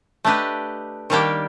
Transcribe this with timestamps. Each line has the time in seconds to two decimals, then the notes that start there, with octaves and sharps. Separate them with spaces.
0.25 A3 D4 G4 B4 D#5
1.10 D#3 G3 A#3 D4 G4